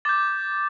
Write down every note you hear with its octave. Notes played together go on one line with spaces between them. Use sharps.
D6 G6 A6